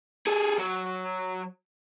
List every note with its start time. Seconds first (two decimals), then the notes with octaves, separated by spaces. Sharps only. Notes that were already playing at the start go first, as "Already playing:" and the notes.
0.27 G#4 A4
0.59 F#3